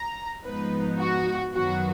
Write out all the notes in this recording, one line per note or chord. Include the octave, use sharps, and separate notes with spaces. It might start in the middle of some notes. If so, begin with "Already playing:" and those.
Already playing: A#5
G#2 F3 B3 D#4 B4
F#4
F#2 D#3 F#3 B3 F#4